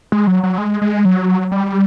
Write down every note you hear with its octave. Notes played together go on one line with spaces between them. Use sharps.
G#3
F#3
F#3
G#3
G#3
F#3
G3